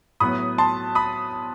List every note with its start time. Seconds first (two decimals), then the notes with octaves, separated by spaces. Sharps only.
0.20 A2 F#3 B3 B5 D#6
0.58 A5 C6
0.95 B5 D#6